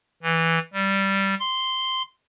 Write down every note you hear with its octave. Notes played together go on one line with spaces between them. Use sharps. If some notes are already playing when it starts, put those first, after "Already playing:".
E3
G3
C6